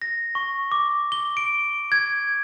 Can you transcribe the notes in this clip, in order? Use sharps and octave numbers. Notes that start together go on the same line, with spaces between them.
A#6
C#6
D6
G7
D7
G#6